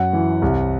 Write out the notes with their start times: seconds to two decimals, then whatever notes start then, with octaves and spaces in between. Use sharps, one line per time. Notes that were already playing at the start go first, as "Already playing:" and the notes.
Already playing: F#2 F#5
0.13 E3
0.42 C2